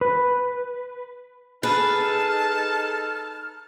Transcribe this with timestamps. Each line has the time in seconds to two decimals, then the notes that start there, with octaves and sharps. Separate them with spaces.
0.01 B4
1.63 D#4 G#4 A4 B4 A5 F6